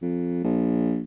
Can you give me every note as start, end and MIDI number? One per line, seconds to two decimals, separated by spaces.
0.02 0.39 41
0.44 1.02 34